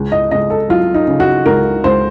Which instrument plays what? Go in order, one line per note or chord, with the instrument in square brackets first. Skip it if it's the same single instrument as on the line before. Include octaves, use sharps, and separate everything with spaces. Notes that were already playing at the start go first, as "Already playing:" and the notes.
Already playing: [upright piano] C#2
D#5
C#2 D#5
A4
F#3 F4
D#4
C#3
F#4
C#2 A#4
C#2 C5